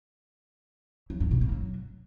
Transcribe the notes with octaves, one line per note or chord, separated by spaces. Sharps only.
F#3
G2
B2
A#3
F#3